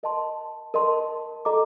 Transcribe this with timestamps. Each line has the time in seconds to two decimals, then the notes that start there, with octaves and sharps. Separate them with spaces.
0.03 A#4 D#5 A5 C6
0.74 A#4 D#5 A5 C6
1.45 A4 D#5 A#5 D6